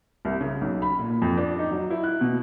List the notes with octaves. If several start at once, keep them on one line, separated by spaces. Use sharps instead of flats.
C2
C#3
B1
B5
A#2
F2
D4
D#4
F#3
E4
F#6
B2